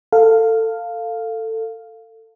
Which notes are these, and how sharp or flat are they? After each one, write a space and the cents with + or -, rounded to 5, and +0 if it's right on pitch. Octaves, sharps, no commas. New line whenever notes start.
A4 +20 F5 +0